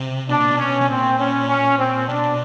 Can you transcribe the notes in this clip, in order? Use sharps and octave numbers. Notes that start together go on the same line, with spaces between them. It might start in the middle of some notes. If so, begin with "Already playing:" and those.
Already playing: C3
B2 D4
A#2
B2
C#4
B2
A#2 C4
C#4
C#4
C4
B2 D4